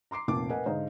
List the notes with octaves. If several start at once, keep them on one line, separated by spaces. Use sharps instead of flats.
A#5 C6 D6 C7
F1 A#2 A#3 C4 A5 D6
A#4 B4 D#5 F#5 G#5
G#2 D3 C5 D#5 F5 A#5